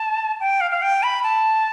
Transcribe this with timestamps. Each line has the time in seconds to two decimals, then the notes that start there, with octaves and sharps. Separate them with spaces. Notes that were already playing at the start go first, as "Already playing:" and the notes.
Already playing: A5
0.40 G5
0.61 F5
0.71 F5
0.82 G5
1.03 B5
1.23 A5